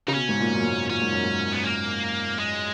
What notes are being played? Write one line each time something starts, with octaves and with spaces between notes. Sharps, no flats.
C#3 D#4
B2 C#4
G#2
A#2
F#2
G#2
A#2 C#4
G#2
F#2
G#2
B3
A#3
G#3